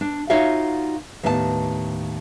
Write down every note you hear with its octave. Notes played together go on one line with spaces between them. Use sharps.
D4
D#4 F4 F#4 C#5 E5 F5
D#2 A2 B3 D#5 A5